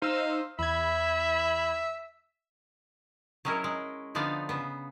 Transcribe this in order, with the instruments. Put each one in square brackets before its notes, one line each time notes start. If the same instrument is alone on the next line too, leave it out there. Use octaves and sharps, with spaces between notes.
[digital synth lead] D#4 [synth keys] C5 E6 [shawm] F5
[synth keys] E2 G#6 [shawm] E5 [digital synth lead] B5
[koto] F#3 G#3 C#4 E4 A#4
G#3
D3 F3 B3 D#4 D5 F5
C#3 B3